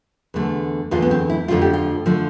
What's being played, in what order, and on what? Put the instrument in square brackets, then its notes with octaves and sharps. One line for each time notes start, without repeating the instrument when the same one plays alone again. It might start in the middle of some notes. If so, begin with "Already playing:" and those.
[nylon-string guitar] E2 D3 A3
E2 D3 A3 F4
B3
C4
E4
F2 D3 F3 A3 F4
G4
F4
D3 F3 A3